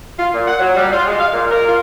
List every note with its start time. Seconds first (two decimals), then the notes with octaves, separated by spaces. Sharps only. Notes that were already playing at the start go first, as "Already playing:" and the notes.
0.18 F4
0.34 A#2
0.47 F#5
0.59 F#3
0.76 G3
0.91 F4
1.06 G#3
1.18 F5
1.32 A#2
1.51 A#4
1.67 F4